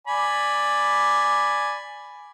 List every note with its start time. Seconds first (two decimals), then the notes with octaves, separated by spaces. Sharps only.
0.07 D5 G#5 B5